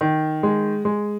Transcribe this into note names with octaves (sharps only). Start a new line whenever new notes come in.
D#3
G#3
G#3